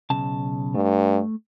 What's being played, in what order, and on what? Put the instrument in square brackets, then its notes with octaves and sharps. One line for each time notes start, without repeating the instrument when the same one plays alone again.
[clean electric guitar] B1 C#3 A5
[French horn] G2 [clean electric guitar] A3